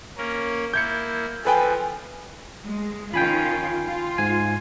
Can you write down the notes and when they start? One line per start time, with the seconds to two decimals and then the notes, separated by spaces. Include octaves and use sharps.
0.17 A#3 C#4 A#4
0.74 A#3 E4 G6 G#6 C#7
1.45 F3 A4 B4 G5 G#5
2.64 G#3
3.14 D#3 C#4 F4 G5 G#5 B5
3.87 F4
4.18 G#2 G#5